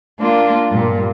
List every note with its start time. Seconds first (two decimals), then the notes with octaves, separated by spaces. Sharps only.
0.18 A#3 D4 F4
0.69 G2 A#2